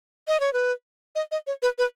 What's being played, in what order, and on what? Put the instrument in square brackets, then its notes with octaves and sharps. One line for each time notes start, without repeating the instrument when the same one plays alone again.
[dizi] D#5
C#5
B4
D#5
D#5
C#5
B4
B4